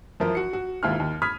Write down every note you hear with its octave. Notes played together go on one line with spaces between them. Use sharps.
F#2 E3 F3 A#4
F#4 C#7
F#4
E1 D#2 G#2 E4 F4 F6
D#2
B5 D#6 F6 G#6 B6